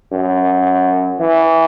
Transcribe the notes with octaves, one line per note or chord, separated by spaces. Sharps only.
F#2
E3